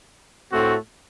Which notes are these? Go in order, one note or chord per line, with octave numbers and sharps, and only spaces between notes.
A2 A3 C4 F#4